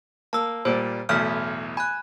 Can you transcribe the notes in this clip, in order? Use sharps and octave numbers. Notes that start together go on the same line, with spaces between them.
A#3 A5 E6
A#2 G3 C5
B1 E2 A2 F6 B6
G#5 B5 F#6